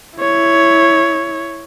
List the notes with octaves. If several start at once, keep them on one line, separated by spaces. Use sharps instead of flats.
E4 C#5